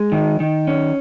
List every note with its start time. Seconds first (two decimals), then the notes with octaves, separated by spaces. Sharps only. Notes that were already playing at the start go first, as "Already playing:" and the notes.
Already playing: G#3
0.12 D#3
0.40 D#3
0.67 C#4